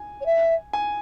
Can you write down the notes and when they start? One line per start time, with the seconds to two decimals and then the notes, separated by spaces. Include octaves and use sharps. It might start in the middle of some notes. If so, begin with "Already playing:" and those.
Already playing: G#5
0.20 C#5
0.25 E5
0.73 G#5